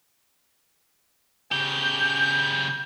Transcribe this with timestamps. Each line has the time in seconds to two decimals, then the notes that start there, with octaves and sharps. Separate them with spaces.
1.52 C#3 G4 G6